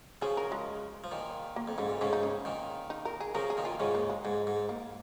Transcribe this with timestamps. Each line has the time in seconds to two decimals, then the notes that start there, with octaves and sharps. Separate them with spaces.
0.22 C#3 F3 G#4
0.37 A#4
0.52 G#3
1.04 F3
1.11 A#2 D#3
1.56 A#3
1.68 F2
1.78 G#2 C#4
1.90 A#2
2.01 G#2 C#3 C#4
2.13 D#4
2.23 C#4
2.45 A#2 D#3
2.90 D#4
3.05 A#4
3.20 G#4
3.35 C#3 F3 A#4
3.50 G#4
3.57 A#2 D#3
3.65 F4
3.80 G#2 C#3 C#4
3.95 A#3
4.10 G#3
4.25 G#2 G#3
4.47 G#2
4.69 A#3